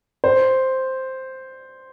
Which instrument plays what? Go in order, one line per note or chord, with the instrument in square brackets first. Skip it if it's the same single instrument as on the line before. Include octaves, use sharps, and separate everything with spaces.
[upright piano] C5